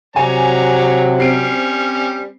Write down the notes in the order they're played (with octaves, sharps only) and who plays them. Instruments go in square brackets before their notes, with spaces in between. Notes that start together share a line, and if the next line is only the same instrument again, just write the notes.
[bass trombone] C3 [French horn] F#3 [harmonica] C#5 D5 A#5 [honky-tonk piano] G#5
[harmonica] G3 C#4 [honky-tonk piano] C4 C7 D7